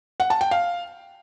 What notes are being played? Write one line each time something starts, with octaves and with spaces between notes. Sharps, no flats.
F#5
A5
G5
F5